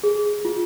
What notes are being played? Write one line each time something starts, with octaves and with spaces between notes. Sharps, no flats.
G#4
F4